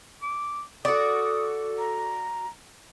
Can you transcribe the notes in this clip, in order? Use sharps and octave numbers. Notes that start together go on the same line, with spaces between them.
D6
F#4 A4 D5 D#6
A#5